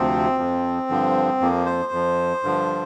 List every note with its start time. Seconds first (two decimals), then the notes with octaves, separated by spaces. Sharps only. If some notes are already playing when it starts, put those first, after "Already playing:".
Already playing: D2 C3 F3 C4
0.38 F2 F3
0.90 G2 D3 F3
1.41 F2 F3 A#3
1.66 C5
1.92 F2 F3
2.43 G2 D3 F3